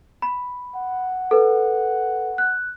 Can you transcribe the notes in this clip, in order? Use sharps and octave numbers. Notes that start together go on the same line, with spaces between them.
B5
F#5
A4 B4
F#6